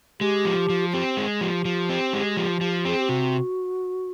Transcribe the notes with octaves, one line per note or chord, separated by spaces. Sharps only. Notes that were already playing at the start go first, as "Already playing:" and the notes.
G#3 G4
F3
F3
C4 G4
G#3 G#4
F3 G4
F3
C4
G#3
F3
F3
C4 G#4
G4
C3 F#4